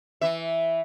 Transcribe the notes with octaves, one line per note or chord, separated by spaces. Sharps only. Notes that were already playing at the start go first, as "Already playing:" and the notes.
E3 E5